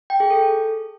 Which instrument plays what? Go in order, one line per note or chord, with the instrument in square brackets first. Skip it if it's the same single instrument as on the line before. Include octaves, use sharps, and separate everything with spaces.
[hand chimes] G5
G#4
A4